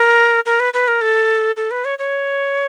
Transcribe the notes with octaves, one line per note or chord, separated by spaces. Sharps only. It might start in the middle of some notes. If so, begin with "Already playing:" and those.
Already playing: A#4
A#4
B4
B4
A#4
A4
A4
B4
C#5
C#5